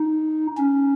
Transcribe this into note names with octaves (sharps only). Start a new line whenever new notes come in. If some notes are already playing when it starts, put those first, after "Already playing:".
Already playing: D#4
C#4